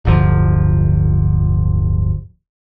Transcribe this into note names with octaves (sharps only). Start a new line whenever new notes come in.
D1 G1 D3 F3